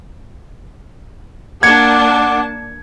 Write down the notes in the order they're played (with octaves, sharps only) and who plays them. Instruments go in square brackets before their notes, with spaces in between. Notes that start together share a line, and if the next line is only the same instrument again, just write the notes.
[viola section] A#3 D4 A5 [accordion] F#5 D6 [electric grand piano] G#6 C#7